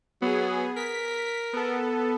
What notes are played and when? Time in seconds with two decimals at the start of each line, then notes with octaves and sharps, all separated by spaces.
0.22 F#3 B3 G#4
0.76 A#4 B6
1.53 B3 A4